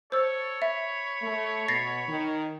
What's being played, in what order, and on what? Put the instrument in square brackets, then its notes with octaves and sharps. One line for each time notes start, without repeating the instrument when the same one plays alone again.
[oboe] A4 [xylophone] C5 E6 [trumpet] C#5
[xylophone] E5 [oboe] B5
[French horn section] A3
[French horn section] B2 [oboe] B5 [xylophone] A6 A#6 C7
[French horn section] D#3